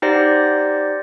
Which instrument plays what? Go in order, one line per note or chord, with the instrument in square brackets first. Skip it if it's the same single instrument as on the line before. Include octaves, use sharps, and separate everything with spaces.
[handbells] D#4 G4 C5 D5 F#5 A#6